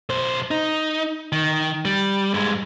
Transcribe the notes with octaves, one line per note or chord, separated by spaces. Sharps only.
B1 C5
D#4
D#3
G3
G2 G#3